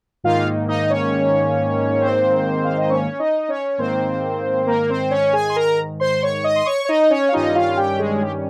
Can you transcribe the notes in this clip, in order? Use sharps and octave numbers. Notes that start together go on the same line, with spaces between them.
G#2 D#3 A#3 D#4 F4 F5
D#4 D#5
C#4 C#5
C4 C5
F5
D#5
C#4 C#5
D#4 D#5
C#4 C#5
G#2 D#3 A#3 C4 C5
A#3 A#4
C4 C5
C#4 C#5
G#4 G#5
C6
A#4 A#5
C5 C6
C#5 C#6
D#5 D#6
C6
C#5 C#6
C#5
D#4 D#5
C#4 C#5
F5
G2 D#3 G3 C#4 D#4 F4 D#5
F4 F5
G4 G5
G#3 G#4
G4